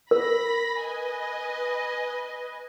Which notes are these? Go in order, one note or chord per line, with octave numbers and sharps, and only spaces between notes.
A#4 B5 A#6 B6
B4 D#5 G#5